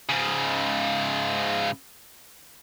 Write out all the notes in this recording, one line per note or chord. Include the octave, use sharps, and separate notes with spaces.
G#2 C#3